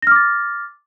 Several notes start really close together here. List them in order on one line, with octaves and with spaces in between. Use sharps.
A#6 F6 D6 A6